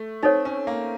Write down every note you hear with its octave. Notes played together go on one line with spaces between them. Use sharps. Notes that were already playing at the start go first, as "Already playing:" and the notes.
Already playing: A3
C4 D#4 A4 C#5 F#5
C#4
A#3